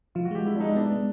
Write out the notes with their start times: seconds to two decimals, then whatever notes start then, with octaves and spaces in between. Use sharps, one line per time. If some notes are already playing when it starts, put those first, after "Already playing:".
0.15 F3 F4
0.25 F#4
0.31 G#3 G4
0.46 G#3 E4
0.56 D4
0.60 G#3 D#4
0.75 B3 D4
0.92 G#3